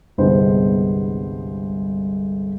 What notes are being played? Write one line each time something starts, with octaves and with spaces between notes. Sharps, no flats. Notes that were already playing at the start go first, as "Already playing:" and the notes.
G1 C2 G2 G#3 B3 C5